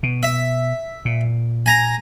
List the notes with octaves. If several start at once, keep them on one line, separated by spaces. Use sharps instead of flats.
B2
E5
A#2
G#5 A#5